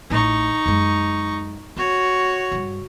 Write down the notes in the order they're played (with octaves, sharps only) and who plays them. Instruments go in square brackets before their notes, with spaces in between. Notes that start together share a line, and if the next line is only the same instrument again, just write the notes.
[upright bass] A1 A2 [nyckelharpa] D#4 C#6
[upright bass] F#2 G#3
[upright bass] C4 [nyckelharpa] F#4 C#5
[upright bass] G2 C#3